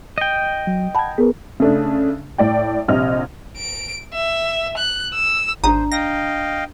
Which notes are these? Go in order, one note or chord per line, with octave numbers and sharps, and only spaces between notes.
D#5 G5
F#3
F#5 A5 B5 G#6
B3 G#4 A#4 B4
C#3 A3 D4
A2 D5 G5
A#1 C3 D#5 F6
D7
E5
F#6
E6
G#1 D4 C5 A#5 D#6
D#5 F5 G5 A#6